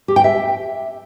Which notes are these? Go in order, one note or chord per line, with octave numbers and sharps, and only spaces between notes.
G4
G5
E5